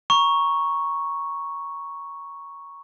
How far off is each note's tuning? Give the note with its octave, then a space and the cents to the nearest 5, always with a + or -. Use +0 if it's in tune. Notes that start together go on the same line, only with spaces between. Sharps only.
A#5 +20 C#6 +0